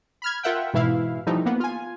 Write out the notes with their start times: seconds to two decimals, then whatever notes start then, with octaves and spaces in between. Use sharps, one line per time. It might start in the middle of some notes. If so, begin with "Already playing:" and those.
0.22 B5 F6 G#6
0.43 F4 A#4 E5 F#5 G5
0.74 G#2 B2 E3 E4 F5
1.27 E3 F3 G3 A3 D#4
1.45 A#3 B3
1.60 F4 G#5